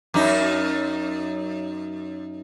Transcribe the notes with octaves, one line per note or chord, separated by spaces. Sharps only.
F#2 D#4